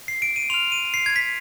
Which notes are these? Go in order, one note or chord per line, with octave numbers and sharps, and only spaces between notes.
C7
D7
D#7
C6 F6 F7
D#7
C7
G#6
B6